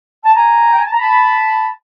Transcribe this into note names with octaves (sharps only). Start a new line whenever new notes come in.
A5
G#5 A#5
G5
G#5
A5
A#5
A5 B5